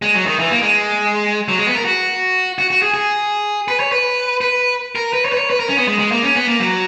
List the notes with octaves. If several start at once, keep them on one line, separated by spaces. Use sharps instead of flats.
G#3
F#3
D#3
E3
A#3
G#3
F#3
G#3
B3
A#4
F#4
F#4
F#4
G#4
G#4
B4
C#5
B4
B4
A#4
B4
C#5
B4
C#5
B4
A#4
C#4
B3
G#3
G#3
A#3
C#4
B3
A#3
F#3